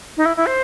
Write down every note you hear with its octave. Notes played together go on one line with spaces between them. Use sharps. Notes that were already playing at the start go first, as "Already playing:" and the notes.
D#4
E4
E4
C5